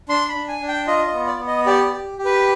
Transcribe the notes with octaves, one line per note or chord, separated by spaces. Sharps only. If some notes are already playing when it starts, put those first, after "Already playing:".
D4 C6
B5
D4
G#5
D4
G5
F4 D#5
D#5
B3
D5
B3
D#5
G4 D5
D5
G4
G4
B4